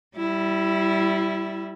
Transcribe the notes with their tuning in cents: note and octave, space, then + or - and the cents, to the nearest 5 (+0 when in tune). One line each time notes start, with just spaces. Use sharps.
G3 -20 E4 +0